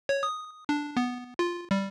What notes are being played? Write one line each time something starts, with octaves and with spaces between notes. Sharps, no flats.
C#5
D#6
D4
B3
F4
G3